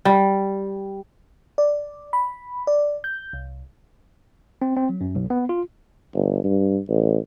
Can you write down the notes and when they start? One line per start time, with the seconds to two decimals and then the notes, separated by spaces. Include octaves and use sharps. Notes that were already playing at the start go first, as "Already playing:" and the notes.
0.05 G3
1.58 D5
2.13 B5
2.67 D5
3.04 G6
3.33 C2
4.62 C4
4.76 C4
4.89 F#3
5.01 F#2
5.15 B1
5.30 B3
5.49 F4
6.14 G1
6.44 G2
6.89 A1